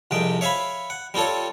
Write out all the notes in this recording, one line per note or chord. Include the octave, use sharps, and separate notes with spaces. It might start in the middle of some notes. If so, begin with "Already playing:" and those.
C2 F2 C3 G#3 G5
C#5 E5 F5 G#5 B5
F#5
G3 C4 F4 A4 C#5